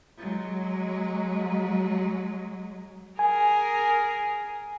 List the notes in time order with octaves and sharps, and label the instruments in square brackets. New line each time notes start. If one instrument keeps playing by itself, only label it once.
[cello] F#3 G#3
[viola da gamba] G#4 A#4 [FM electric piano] G#5